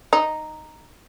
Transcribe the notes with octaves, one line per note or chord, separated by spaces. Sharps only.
D#4